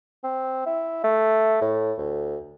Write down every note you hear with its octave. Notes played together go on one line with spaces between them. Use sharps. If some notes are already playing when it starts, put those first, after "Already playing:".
C4
E4
A3
A2
D2